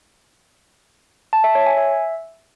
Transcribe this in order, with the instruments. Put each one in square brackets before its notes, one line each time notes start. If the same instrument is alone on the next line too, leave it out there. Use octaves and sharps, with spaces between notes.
[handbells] A5
E5
C#5
G#5
E5